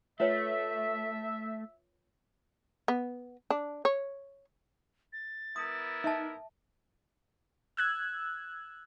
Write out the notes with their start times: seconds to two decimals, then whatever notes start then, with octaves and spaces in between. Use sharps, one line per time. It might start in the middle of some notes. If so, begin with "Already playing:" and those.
0.20 A3 F4 B4 C#5 E5
2.88 B3
3.50 D4
3.85 C#5
5.13 A6
5.56 B3 E4 A#4 D#6
6.04 D#4 E5 A5
7.77 E6 F#6 G#6